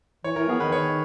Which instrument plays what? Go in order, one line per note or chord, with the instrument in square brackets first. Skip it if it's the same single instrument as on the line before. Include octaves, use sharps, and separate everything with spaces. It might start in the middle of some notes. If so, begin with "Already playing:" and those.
[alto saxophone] E3 [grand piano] C#5
[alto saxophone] E3 [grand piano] A#4
[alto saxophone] B3 [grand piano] G#4
[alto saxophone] D#3 [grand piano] B4
[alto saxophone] D#3 [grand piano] C#5